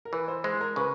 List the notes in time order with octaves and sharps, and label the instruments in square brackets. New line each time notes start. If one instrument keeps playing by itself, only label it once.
[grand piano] A#4
[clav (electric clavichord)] E3 [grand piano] B4
[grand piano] C5
[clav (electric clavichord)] G#3 [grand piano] C5
[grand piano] A#4
[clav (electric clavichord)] C#3 [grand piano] B4